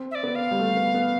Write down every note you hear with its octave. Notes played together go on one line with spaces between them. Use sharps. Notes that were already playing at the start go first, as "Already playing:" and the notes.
Already playing: C4
E5
D5
B3
F5
G3
A3
B3
B3